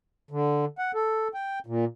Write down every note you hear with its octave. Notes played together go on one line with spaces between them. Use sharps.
D3
F#5
A4
G5
A#2